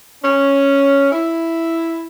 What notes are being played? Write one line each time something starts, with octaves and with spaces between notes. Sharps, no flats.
C#4
E4